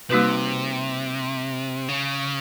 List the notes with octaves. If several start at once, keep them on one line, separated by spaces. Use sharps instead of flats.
C3 G3 A#3 D#4 F#4 B4
C#3